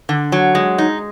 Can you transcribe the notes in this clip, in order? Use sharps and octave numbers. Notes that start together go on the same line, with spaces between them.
D3
F#3
G#3
D#4